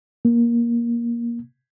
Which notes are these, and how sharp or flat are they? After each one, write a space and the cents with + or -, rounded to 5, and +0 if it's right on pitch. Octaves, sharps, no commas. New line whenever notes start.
A#3 +15